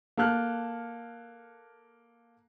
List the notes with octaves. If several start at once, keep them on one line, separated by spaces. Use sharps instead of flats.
A#3 A4 A5 F6 F#6